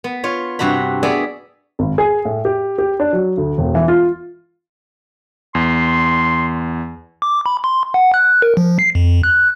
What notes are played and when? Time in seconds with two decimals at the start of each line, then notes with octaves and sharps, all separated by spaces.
0.04 B3
0.24 F4 C#5
0.59 G2 C3 F#4 A#5 B5
1.03 B3 G#4 D5 E5
1.79 G#1
1.98 G#4
2.25 A2
2.45 G4
2.79 G4
3.00 D4
3.13 F#3
3.37 D2
3.58 E1
3.75 E3
3.88 F4
5.55 E2 C6
7.22 D6
7.46 B5
7.64 C6
7.94 F#5
8.14 F#6
8.42 A#4
8.57 F3
8.79 C7
8.95 F2
9.23 F#6